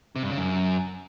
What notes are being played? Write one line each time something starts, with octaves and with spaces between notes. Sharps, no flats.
C3
G2
C#3
F#2